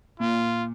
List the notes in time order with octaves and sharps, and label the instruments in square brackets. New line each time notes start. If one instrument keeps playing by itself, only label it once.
[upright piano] A#2 [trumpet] F4